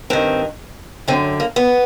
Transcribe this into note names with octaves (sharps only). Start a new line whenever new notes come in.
G2 D#3 C4
F#2 D3 C4
A#3
B3